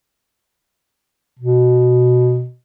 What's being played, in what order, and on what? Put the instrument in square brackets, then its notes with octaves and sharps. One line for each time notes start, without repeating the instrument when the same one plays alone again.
[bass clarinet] B2